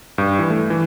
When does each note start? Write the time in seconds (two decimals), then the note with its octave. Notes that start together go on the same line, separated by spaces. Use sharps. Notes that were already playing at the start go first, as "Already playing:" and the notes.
0.18 G2
0.39 E3
0.50 A3
0.70 E3